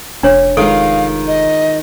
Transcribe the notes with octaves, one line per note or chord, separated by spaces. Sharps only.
F1 D4 C#5
D#3 G#3 F4 A4 F5
D#5